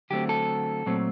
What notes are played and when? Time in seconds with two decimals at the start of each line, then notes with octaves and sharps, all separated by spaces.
0.10 D3 F#3 A3 C4 G4
0.29 A4
0.86 A#2 F#3 A3 C4